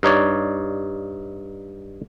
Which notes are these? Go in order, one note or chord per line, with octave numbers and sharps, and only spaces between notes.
G2 D#4 C#5 D5